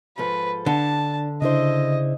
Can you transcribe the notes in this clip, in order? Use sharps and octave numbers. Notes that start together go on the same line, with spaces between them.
G#2 F3 A4 B4
D3 D4 A5
C#3 D4 E4 C5 D#5